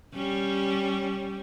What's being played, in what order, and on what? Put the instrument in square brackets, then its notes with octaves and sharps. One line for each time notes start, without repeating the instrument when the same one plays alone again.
[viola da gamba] G3 C#4